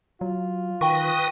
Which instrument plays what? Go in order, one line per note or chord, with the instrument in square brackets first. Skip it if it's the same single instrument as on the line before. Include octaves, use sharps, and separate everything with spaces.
[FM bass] F#3 [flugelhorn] F4
[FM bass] D#3 [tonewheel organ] B4 D#6 A#6 [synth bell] G5 C#6